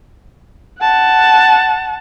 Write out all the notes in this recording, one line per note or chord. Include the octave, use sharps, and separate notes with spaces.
F#5 A5